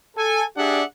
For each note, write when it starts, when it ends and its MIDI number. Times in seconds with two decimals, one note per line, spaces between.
0.17 0.44 69
0.17 0.44 80
0.57 0.82 62
0.57 0.82 67
0.57 0.82 68
0.57 0.82 74
0.57 0.82 76
0.57 0.82 78